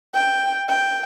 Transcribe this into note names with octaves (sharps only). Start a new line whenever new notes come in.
G5
G5